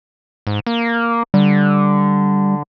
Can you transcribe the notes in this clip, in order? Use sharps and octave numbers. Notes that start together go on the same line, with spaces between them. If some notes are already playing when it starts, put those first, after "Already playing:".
G#2
A#3
D3 G3